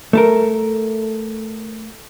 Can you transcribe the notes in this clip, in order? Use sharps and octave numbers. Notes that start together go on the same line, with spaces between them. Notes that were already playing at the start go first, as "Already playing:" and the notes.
A3 A4 A#4